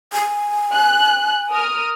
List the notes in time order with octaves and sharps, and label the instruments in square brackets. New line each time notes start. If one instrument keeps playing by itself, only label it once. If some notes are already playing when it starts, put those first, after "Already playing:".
[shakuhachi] G#5
[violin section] F#6
A#4 D#6 F6